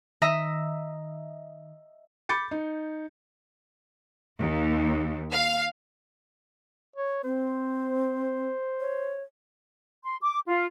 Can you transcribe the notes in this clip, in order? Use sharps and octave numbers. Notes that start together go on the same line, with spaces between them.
D#3 D#5 E5 A#5
B5 D6 G6 A6 C#7
D#4
D#2
F5
C#5
C4 C5
C#5
C6
D6
F4